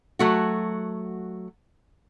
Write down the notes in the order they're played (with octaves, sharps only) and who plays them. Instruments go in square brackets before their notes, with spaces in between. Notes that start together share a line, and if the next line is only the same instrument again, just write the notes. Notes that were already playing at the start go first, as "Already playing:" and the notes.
[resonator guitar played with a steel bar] F#3 A3 F#4